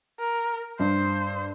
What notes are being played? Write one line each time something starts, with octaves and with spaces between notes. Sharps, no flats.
A#4
G2 C5